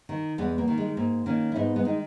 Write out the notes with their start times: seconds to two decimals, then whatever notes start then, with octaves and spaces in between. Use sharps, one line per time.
0.09 D#3
0.38 E2 G#3 B3
0.58 A#3
0.68 D#3
0.78 G#3
0.97 G#2 A#3
1.26 D#3 A#3 C#4
1.52 E4
1.56 G#2 B3 D#4
1.76 G#3 B3
1.85 D#3 D#4